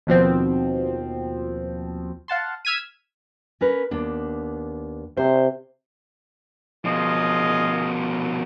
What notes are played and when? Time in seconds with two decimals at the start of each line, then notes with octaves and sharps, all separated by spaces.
0.07 D#2 B2 F3 C4
2.28 F5 F#5 A5 C6
2.65 E6 F6 G#6 B6 D#7
3.61 C#4 A#4 B4
3.91 D#2 B3 D4
5.17 C3 C5
6.85 B2 F3 F4 G#4 D#5